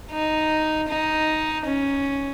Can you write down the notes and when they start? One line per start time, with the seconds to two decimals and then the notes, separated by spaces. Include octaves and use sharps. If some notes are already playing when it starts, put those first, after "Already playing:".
0.11 D#4
0.88 D#4
1.66 C#4